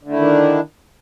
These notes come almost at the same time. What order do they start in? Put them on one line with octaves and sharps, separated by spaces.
D3 A3 E4 D#3 D4